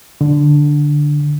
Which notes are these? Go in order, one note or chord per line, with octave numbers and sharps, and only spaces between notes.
D3